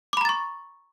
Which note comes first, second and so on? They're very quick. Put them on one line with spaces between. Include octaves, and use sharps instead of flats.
D6 B5 A#5 A6 C#6